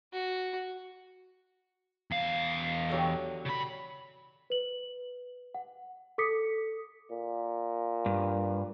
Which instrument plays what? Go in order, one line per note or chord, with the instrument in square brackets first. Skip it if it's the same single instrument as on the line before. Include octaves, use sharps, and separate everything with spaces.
[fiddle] F#4
[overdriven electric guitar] E2 F5
[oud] D3 F#3 G4
[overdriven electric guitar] C#3 B5
[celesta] B4 F#7
F#5
A4 D6 D#6 B6 C#7
[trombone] A#2
[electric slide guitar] G2